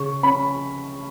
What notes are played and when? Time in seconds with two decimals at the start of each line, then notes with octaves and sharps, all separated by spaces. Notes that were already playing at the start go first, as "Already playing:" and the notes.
Already playing: C#3 C#6
0.23 C#4 B5